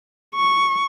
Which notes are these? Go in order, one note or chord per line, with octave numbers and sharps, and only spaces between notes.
C#6